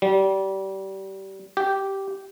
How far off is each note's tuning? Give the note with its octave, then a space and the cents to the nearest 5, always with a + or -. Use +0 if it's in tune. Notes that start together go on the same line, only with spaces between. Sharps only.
G3 -25
G4 -10